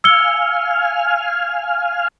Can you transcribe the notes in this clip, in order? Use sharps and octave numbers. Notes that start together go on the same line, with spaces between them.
F5 G#5 E6 F6 C#7 G7